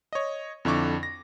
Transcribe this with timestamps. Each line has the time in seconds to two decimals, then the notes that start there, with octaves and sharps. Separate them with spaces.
0.13 C#5 D#5
0.65 F2 D3 E4 C#6 D6
1.03 A#6